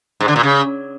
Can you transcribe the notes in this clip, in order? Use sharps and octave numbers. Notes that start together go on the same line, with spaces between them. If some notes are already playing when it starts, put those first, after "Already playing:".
G#2
D3
A#2
C#3